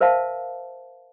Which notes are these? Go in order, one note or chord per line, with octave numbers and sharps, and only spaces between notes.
A#4 C5 E5 F5 A5